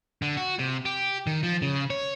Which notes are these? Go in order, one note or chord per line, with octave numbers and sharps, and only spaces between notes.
D3
F#4
C3
G4
D#3
F3
C#3
C#5